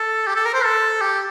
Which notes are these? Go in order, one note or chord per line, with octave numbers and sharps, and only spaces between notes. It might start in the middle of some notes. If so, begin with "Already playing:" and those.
Already playing: A4
G4
A4
A#4
C5
A4
G4